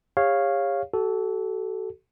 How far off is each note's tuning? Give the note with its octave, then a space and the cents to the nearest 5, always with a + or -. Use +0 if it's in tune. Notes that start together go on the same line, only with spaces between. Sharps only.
G4 +45 C#5 -5 F5 +0
F#4 +40 A4 -10